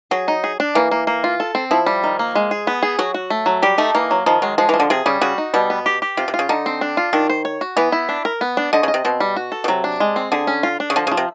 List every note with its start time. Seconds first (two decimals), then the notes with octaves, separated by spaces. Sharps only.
0.11 F#3 G#4
0.28 D#4
0.44 G#4
0.60 D4
0.75 E3 A#3
0.91 A#3
1.07 A#3
1.24 F4
1.40 A4
1.55 C4
1.71 F3 E4
1.86 G3
2.04 D#3
2.19 A#3
2.35 G#3
2.51 G#4
2.67 B3
2.83 G#4
2.99 F#3 F#4
3.14 F#4
3.30 A3
3.46 F#3
3.62 G3 G4
3.78 A3 D#4
3.95 E3 A#3
4.11 F#3
4.26 D#3 F3
4.42 F#3 G#3
4.58 F3 G#3
4.69 E3
4.74 F3
4.80 D3
4.90 C3 G#4
5.06 C#3 G3
5.21 C#3 F#4
5.38 D#4
5.54 B2 G3
5.70 B3
5.86 G4
6.02 G4
6.17 C3 F4
6.28 C3
6.34 F4
6.39 C#3
6.49 D3 D#4
6.66 C4
6.81 D4
6.97 F4
7.13 D#3 D4
7.29 C5
7.45 C#5
7.61 F#4
7.77 E3 B3
7.92 E4
8.09 D4
8.25 A#4
8.41 B3
8.57 D4
8.73 D3 D#5
8.83 C#3
8.88 D#5
8.94 C3
9.05 B2 C4
9.20 G3
9.36 F#4
9.52 A4
9.64 B2
9.68 C3 F#3
9.84 D4
10.00 G#3
10.16 C4
10.32 D3 G#4
10.47 C#4
10.63 F4
10.80 D4
10.90 C#3
10.96 D3 F3
11.07 C#3
11.11 F3
11.17 C3